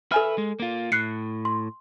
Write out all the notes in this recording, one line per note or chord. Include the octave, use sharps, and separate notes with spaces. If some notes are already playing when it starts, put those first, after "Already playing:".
A4 B4 E5 G#5 F6
G#3
A#3 F4
A2 F#6 C7 C#7
C6